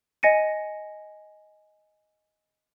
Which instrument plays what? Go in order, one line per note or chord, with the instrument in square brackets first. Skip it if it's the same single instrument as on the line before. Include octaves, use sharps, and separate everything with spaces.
[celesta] D#5 G#5 A#6 C#7 D#7